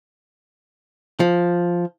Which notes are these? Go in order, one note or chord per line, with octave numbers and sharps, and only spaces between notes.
F3